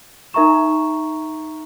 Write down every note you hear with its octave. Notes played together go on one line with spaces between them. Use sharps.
D#4 A#4 E5 A#5 C#6 E7